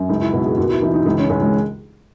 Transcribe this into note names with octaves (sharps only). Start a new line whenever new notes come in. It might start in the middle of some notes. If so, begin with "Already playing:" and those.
Already playing: F#2
C#2 D#4
E4
B2 F#4
G#4
D#2 F#4
E4
E3 D#4
D#4
C#2 D#4
C#4
C#2 G#3
G#3